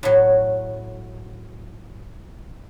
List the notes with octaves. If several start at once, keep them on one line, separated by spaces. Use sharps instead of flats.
A2 F#3